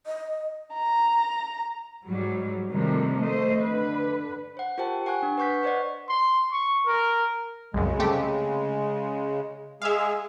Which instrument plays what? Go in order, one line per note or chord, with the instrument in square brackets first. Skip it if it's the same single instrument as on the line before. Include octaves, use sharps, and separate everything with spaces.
[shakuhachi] D#5
[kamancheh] A#5
[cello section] G#2 F#3 G3
C3 D#3 F3 G3 A3 A#3
A3 C5 D#5
D3 B4
[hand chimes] C5 F#5
F4 G4 A#4 C5 G5 A5
F#5 G#5 C#6 F#6
D4
B4 F#5 C#6 G6 B6
B4 C5 D5 D#5 F#5
[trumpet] C6
C#6
A#4
[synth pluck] C2 F#2 [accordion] C#3 G#3
[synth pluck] C3 A3 G4
[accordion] G#3 G#4 [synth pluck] E5 F5